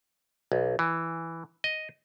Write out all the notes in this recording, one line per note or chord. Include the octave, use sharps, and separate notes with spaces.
B1
E3
D#5